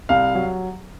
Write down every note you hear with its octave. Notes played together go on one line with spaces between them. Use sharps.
C2 F5
F#3